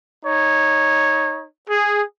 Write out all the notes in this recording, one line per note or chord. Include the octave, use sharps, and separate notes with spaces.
D#4 C#5
G#4